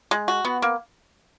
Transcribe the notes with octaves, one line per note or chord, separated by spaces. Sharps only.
G#3
F#4
B3
A#3